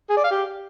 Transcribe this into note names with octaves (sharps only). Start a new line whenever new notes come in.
G#4
D5
F5
G4